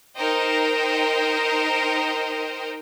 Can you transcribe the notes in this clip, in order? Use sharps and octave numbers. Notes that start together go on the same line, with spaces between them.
D#4 A#4 C5 D#5 G5